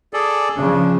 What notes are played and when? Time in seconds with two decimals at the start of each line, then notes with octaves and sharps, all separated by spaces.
0.13 G#4 A4 D5
0.56 C#3 F3 D4